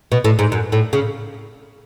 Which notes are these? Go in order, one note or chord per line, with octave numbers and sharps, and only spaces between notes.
B2
A2
G#2
F#2
A2
C#3